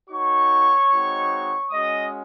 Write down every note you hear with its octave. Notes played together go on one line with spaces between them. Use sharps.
A#3 D#4 F#4 C#5 C#6
G#3 C4 D#4 F#4
G#3 C#4 F#4 D#5 D#6